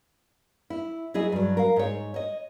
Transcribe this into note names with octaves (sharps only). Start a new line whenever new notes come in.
E4
F#3 E4 G#4 D#5
G2 F#3
A#4 F5
G#2 C#5
C#5 D#5